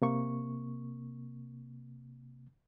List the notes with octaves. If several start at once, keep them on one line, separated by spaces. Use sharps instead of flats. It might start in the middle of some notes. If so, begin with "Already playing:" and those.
C3 A#3 C#6